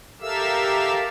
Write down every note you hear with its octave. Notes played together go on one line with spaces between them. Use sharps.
G4 A4 A#4 E5 F5 E6